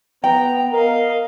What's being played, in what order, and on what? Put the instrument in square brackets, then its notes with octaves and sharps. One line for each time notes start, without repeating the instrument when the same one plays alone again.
[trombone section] B3 [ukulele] G5 [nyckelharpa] A#5
[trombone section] A#4 [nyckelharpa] D#5 F5